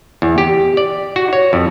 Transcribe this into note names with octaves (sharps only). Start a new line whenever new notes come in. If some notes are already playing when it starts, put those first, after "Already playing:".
E2
G4
D5
F#4
C#5
F2